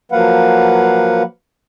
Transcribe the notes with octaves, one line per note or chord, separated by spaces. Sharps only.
F3 F#3 A#3 B4 F5 F#5